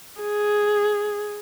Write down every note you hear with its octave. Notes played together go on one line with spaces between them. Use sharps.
G#4